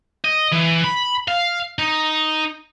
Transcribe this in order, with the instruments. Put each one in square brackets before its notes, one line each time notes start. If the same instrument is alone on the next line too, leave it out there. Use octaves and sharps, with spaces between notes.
[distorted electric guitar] D#5
E3
B5
F5
D#4